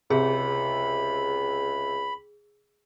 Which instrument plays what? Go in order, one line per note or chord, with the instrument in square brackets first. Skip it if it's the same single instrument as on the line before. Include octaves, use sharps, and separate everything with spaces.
[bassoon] C#2 [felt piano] C3 [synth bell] G#4 [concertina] B5